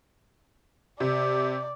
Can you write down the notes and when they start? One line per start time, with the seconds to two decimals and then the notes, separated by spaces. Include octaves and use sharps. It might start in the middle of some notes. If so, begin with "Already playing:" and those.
1.00 C3 D5